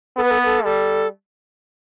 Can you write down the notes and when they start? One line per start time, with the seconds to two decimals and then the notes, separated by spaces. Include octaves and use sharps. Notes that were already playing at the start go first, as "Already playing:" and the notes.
0.17 B3 A4
0.24 B4
0.31 A4
0.38 B4
0.45 A4
0.64 G3 A4